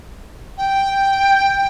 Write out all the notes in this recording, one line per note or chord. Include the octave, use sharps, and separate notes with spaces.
G5